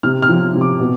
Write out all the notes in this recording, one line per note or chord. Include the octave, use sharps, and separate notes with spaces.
C3 F6
F6
F3
C3
D6
B2